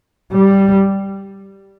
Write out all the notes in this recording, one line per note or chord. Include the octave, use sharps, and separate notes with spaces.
G3